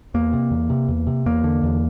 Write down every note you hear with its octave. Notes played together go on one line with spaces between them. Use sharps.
E2 A#3
C3
E2
C3
E2
C3
E2 A#3
D3
E2